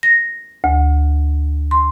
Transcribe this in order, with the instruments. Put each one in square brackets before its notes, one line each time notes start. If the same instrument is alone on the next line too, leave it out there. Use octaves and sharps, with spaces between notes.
[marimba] A#6
D2
C6